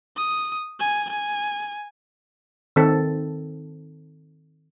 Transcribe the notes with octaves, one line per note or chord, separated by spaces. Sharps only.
D#6
G#5
G#5
D#3 C4 A4